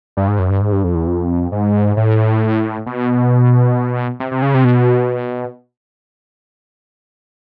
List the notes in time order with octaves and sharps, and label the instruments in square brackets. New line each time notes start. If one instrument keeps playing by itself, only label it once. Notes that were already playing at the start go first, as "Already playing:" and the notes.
[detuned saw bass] G2
G#2
F#2
G2
G#2
G2
F2
E2
F2
G#2
A2
B2
C3
C3
C#3
C3
B2